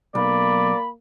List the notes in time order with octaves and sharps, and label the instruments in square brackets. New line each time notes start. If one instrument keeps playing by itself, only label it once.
[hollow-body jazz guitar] B1 [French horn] A#3 [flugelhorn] D5 [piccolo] B5